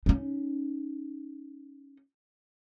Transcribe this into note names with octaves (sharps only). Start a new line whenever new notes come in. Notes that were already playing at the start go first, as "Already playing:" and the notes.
C#4 D#4